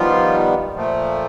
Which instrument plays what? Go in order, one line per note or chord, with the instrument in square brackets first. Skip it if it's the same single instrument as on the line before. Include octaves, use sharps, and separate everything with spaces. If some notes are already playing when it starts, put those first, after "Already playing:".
Already playing: [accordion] D#3 F3 G3 B3 F4
A#2 F3 A3